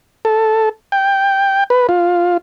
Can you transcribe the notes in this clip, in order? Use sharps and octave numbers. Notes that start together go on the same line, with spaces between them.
A4
G5
B4
F4